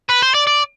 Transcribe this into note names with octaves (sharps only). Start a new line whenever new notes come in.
B4
C5
D5
D5